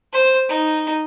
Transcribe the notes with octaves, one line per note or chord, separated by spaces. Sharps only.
C5
D#4